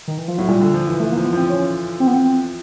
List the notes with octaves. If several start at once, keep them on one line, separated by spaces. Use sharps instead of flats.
D#3
E3
F3
A2 F#3
A#2 G3
D3
F3
E3
A3
A#3
F3
B3
F3 C4
C#4
C4
B3
C4